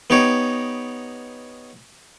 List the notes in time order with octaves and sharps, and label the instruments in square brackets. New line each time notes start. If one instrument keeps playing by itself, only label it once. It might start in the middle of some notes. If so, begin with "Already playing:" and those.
[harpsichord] B3 D#4 G4 C#5